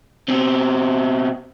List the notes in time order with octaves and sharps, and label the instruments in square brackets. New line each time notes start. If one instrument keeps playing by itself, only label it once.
[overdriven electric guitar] B2 C4